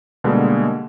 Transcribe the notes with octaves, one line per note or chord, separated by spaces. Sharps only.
B2 D3 G3 G#3 A#3